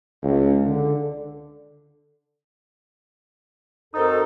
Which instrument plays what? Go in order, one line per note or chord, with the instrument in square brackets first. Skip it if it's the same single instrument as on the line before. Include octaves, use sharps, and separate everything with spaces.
[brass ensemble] C#2
D3
[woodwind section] F2 F#4 A4 [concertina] D#4 [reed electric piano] A#4 C5 D#6